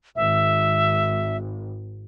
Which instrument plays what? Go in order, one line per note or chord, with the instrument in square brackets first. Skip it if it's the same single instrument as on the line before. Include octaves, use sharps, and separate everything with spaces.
[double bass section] G#1 [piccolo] E5